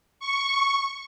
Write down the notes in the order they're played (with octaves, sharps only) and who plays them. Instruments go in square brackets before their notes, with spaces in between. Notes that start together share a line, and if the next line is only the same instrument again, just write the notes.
[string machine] C#6